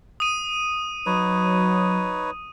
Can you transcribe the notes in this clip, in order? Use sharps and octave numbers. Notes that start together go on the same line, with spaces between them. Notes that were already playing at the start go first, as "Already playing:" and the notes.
D#6 D#7
F#3 D#4 B4 C#5